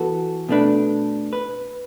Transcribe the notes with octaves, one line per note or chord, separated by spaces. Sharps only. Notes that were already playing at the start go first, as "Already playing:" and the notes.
Already playing: E3 B3 F#4 A4
B2 A3 D4 B4
B4